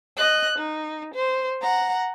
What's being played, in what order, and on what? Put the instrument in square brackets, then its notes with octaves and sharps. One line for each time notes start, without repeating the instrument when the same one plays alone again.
[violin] D#5 F#6
D#4
C5
F#5 A#5